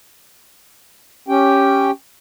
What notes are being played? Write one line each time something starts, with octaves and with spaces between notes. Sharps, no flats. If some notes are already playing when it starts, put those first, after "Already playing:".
C#4 G4 G5